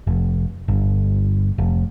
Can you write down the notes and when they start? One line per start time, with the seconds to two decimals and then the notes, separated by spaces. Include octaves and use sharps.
0.07 F1
0.68 G1
1.58 F1